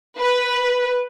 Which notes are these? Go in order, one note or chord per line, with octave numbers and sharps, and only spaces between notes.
B4